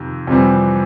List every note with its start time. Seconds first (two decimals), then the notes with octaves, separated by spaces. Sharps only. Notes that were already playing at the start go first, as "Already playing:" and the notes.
Already playing: F2 C3 D#3
0.27 F2 C3 E3 G3 C4